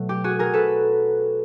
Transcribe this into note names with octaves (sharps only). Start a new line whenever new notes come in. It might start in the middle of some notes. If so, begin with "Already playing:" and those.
Already playing: B2 F#3 A3
G4
F#4 G#4
G#4 A#4
A4 B4